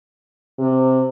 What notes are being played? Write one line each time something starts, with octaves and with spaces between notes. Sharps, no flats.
C3